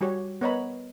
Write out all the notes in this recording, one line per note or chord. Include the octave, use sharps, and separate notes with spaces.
G3 F#4 G4 C#5
B3 A#4 C#5 D#5 A#5 B5